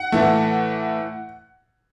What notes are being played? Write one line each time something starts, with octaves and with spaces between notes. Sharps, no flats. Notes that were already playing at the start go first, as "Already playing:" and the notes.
Already playing: F#5
A2 E3 A3